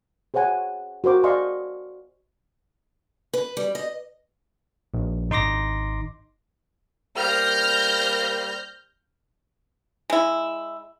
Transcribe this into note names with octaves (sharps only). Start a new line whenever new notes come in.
G#4 C5 C#5 F#5 G#5
F#4 A#4 C5 D6
D5 D#5 F5 G#5 C6 C#6
B4
G3
D#5
A#1
G#1 D#4 C6 D6 A#6
G3 A#3 C5 F6 G6 A#6
G#3 E4